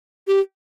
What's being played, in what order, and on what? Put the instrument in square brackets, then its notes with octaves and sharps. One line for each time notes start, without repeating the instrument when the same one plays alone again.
[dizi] G4